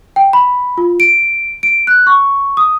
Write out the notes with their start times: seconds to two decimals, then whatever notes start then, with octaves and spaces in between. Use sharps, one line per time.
0.16 G5
0.33 B5
0.78 F4
1.00 D7
1.63 D7
1.87 F#6
2.07 C#6
2.57 D#6